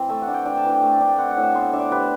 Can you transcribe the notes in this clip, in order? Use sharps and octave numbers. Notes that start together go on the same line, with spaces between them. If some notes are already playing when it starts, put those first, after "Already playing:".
Already playing: E3 C4
A3 E5
F#5
D4
G5
D4 G5
A5
E3
G5
A3
D4
G5
C4 F#5
F#5
A2
E5
B3 C5
D4 E5
D5
G3 B4